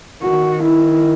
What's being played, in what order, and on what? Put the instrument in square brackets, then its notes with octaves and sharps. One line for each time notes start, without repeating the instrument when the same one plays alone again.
[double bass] D#3 [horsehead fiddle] F#4
[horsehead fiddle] E4